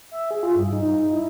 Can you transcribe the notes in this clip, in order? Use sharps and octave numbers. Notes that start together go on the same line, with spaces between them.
E5
G#4
F4
G2
D#4
D#4
E4